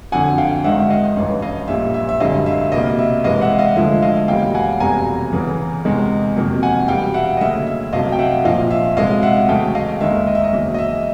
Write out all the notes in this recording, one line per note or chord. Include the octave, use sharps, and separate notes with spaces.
F2 D3 F#3 F#5 G#5
F5 G5
G#1 G#2 D#3 F#3 E5 F#5
D#5 F5
A1 G2 E3
D#5 F5
A#1 A#2 G3 E5
E5
E5
G#1 F#2 D3 G3 D#5 F5
E5
C2 B2 G3 A#3 D#5
E5
C2 C3 E3 G#3 D#5 F5
E5 F#5
D#5 F5
D2 D3 F3 G#3 E5
D#5 F5
F#1 E2 B2 G3 F5 G5
F#5 G#5
F1 E2 B2 G3 G#5 A#5
E2 C#3 E3
E2 C3 D#3 G#3
F2 C3 D#3 F#3 A#3
F#5 G#5
E2 B2 G3 F5 G5
E5 F#5
D#5
D2 C#3 F#3 A#3 E5
E5
C2 B2 F#3 A3 D#5 F5
G5
E5 F#5
A#1 A#2 F3 D#5 F5
E5
C2 B2 G#3 D#5 F5
E5 F#5
E2 C#3 F#3 A3 F5 G5
D#5 F5
D#2 D#3 G#3 E5
D#5
E5
D#5
E2 C#3 F#3 A#3
D#5
E5